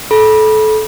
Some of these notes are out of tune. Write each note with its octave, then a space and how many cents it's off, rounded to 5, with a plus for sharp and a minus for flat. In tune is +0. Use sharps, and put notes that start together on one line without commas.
A4 -25 B5 -25